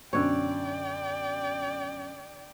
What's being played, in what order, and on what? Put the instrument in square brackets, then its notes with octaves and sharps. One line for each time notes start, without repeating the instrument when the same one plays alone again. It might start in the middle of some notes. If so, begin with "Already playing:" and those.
[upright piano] F#2 B2 C#4 [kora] D3 C#5 [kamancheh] D5 G5